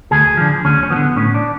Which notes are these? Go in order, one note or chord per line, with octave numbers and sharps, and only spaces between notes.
D2 G#4
D3 F3
D2 C#4
C#4
F3 B3
D3
A2 C#4
D4